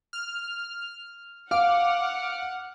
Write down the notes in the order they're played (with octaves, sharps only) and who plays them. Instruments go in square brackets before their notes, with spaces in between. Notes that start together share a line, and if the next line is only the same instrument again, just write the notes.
[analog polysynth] F6
[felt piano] F5 [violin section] F#5 [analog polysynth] D6 F6